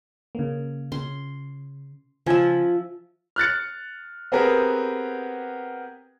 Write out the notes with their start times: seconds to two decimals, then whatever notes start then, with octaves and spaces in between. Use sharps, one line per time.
0.35 C#3 A#3
0.92 C#3 C6
2.26 C#3 F3 E5 G#5
3.36 F6 F#6 A6 C#7
4.32 B3 C4 G4 G#4 A#4 B4